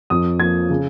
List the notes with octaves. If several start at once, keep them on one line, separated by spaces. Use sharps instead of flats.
F2 D#6
F3 A#3 G#6
C#3